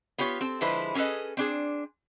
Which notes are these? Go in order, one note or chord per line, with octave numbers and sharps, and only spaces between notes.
B3 F4 G4 C#5
C4 A4
D3 F3 G#3 E4 B4 C5
C#4 G#4 A4 B4 D#5
C4 D4 G#4